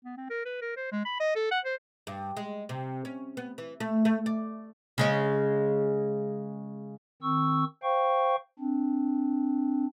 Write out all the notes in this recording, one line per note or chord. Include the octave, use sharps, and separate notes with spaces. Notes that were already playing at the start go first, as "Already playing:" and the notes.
B3
C4
A#4
B4
A#4
C5
G#3
B5
D#5
A4
F#5
C5
G2
G#3
C3
C#4
B3
E3
A3
A3
D5
C#3 G#3 C#4
D#3 C4 C#6 E6
C5 F5 G5 C#6
C4 D4